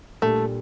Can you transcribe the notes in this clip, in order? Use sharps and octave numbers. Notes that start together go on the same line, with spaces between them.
A#2 G3 A3 D4 A4